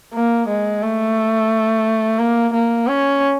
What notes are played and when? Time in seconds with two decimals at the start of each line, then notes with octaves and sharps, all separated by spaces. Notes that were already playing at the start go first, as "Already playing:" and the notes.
0.14 A#3
0.48 G#3
0.82 A3
2.19 A#3
2.53 A#3
2.88 C#4